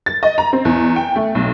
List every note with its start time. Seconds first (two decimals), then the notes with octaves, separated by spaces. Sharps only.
0.06 A6
0.23 D#5
0.38 A#5
0.53 C4
0.65 E2
0.96 G5
1.16 A3
1.35 B1